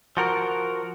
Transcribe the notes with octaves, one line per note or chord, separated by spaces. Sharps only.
F3 F#4 A#4